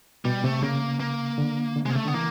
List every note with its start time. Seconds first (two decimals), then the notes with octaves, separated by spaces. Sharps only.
0.25 B2 G3
0.44 C3 A3
0.63 C#3 A#3
1.00 A#3
1.38 D3
1.76 D3
1.86 C3 G#3 A#3
1.95 C#3 A3
2.05 D3 B3
2.14 E3 A#3